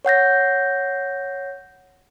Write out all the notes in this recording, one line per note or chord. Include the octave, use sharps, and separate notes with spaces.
C#5 F#5 G6 A#6